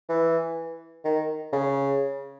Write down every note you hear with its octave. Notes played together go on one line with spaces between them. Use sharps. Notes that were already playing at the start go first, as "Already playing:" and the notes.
E3
D#3
C#3